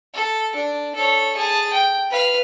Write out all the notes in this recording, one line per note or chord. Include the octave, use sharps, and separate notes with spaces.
A4
D4
A4 C#5
G#4 A5
G5
B4 F5